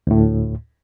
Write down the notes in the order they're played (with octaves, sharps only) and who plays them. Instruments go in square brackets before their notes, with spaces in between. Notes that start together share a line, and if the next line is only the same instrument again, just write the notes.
[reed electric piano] D2 A2